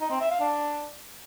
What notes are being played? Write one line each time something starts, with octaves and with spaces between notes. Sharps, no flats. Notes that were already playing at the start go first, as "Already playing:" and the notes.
D#4
C4
E5
F5
D4